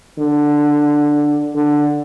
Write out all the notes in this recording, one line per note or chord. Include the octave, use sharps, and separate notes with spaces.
D3
D3